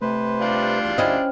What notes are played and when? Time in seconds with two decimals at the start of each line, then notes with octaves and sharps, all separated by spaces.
0.02 C3 A3 B4 C5
0.41 G3 D4 F4
0.84 E2 C6
0.98 D2 C#4 E4 C5 D#5 E5 G5 F6